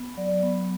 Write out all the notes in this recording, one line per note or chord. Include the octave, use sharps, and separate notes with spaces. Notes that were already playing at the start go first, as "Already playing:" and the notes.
Already playing: B3
F#3 D5
B3